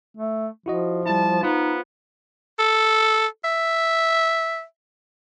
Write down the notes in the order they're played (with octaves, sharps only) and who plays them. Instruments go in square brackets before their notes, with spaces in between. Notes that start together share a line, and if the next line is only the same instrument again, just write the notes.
[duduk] A3
[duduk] F3 [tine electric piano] E4 F#4 D#5
[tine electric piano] G3 E4 [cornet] A5
[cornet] B3 [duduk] D#4 [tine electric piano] F4 C5
[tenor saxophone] A4
E5